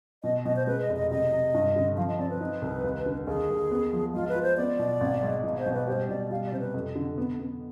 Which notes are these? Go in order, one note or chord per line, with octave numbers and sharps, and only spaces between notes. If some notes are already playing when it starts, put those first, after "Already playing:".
B2 D#5
B2 D#5
C5
G#3 B4
D#5
F1
D#5
C3 D#5
C3
G2
D3
F3 F5
D#5
C4 D5
B4
D#4
C2
D#2
D3
D#2 G#4
D#2
B3
F3
G#2 F4
B4
F4
C5
B3 D5
B2
G#1
G#2
B2
C5
B2
B4
G3 C5
B2 D5
G3 F5
D5
C3 C5
B4
F2
D3
B3
B3